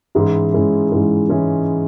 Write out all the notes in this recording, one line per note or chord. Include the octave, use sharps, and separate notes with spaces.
G#2 E3 G#3 C#4 E4
G#2 E3 G#3 C#4 E4
G#2 E3 G#3 C#4 E4
E3 G#3 C#4 E4